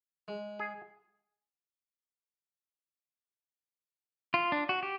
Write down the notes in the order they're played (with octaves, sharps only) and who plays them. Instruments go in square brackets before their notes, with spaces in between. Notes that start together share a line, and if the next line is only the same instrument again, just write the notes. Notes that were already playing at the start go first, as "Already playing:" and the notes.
[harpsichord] G#3
[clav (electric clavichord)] G#4
[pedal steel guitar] F4
D4
F#4
G4